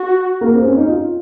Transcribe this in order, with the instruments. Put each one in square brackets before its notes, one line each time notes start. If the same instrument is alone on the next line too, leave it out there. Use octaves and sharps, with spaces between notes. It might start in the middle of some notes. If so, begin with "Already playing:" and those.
Already playing: [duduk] F#4
[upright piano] A#3
C4
C#4
D#4
F4